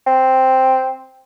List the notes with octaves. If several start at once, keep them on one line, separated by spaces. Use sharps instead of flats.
C4